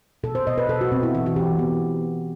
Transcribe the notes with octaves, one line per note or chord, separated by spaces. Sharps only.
B2 A4
C5
B2 D#5
B4
B2 A4
F#4
B2 C4
E4
E3 F#4
F#4
E3 G4
E3 B3